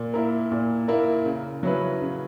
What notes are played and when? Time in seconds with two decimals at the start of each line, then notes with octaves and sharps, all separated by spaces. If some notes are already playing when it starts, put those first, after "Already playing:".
Already playing: A#2
0.14 A#3 E4 A#4
0.52 A#2
0.88 A#3 E4 A#4
1.26 C#3
1.63 F#3 C#4 E4 B4
2.01 C#3